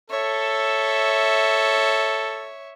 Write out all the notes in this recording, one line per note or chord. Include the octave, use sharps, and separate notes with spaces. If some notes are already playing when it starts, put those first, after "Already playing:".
A4 C#5 E5